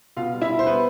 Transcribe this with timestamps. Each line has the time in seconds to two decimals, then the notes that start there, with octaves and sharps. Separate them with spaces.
0.17 B2 F4 F5
0.33 G3
0.42 E4 E5
0.50 B2
0.59 C5
0.66 G3 B3 B4